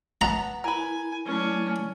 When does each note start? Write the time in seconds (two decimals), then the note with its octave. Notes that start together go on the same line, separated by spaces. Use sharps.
0.21 B3 F#5 A5 A#5
0.64 E4 A#4 B4 G#5
1.26 F#3 A3 C#4 D4 E4